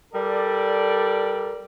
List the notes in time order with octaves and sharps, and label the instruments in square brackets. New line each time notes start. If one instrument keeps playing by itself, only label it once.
[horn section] G3 A4 A#4 D5